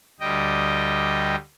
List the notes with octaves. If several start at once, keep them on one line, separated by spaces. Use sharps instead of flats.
D2 G3 D#5 G5